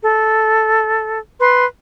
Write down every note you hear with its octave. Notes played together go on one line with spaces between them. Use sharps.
A4
B4 C6